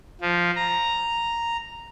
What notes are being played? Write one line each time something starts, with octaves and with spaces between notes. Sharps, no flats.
F3
A#5